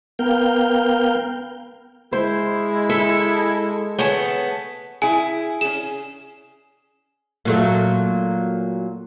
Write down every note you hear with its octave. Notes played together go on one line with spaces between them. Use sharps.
B3 A#4 F5 G5
G#3 E4 C5
A4 E5
A3 B3 G#4 C#5 A5
E4 G#4 G#5
C#4 G#4 E7
A#2 F#3 A3